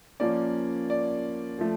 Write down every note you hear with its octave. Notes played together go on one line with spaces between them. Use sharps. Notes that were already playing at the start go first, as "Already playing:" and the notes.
F3 A#3 C#4 D5
D5
F3 A3